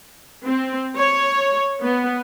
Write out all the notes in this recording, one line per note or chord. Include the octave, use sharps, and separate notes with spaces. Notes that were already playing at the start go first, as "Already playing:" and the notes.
C4
C#5
B3